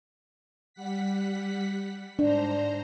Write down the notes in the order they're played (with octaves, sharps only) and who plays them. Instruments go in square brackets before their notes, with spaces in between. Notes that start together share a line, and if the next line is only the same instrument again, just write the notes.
[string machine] G3 F#5 B6
[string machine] G#2 C5 A#5 [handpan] D4